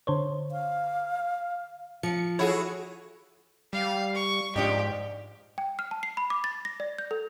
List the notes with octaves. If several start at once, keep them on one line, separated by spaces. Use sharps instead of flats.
D3 C5 C#5
F5
F3 C#7
E4 F#4 G#4 A4 C#5
G3 F5
C#6
G#2 F3 D4 G4 D#5
G5
F6
A5
C7
B5
D6
A6
A#6
D5
G6
A4